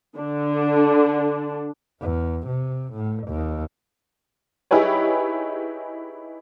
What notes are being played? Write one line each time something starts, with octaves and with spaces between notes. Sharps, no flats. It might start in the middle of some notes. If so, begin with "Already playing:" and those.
D3 D4
E2
C3
A2
D#2
D#4 E4 G4 G#4 B4 C#5